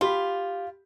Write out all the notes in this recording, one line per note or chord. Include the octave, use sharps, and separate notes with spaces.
F4 G4 B5